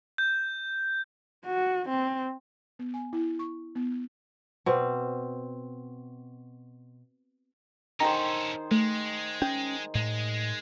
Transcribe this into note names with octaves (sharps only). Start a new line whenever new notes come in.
G6
F#4
C4
B3
G#5
E4
C#6
B3
B2 C4
D#3 C#4 G#4 A4 C5 A#5
G#3 A3
C#4 G5
A2 G#3